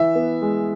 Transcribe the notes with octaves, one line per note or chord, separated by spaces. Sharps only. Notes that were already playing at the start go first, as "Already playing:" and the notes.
Already playing: E3 E5
B3
G#3